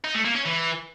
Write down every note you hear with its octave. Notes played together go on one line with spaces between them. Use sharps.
D#4
A3
A#3
C#4
E3